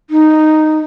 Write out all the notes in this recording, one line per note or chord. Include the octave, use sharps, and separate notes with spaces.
D#4